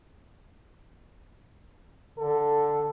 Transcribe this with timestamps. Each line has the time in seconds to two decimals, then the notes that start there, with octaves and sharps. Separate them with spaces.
2.18 D3 A4